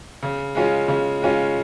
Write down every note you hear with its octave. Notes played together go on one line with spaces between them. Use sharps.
C#3
G#3 C#4 F4
C#3
G#3 C#4 F4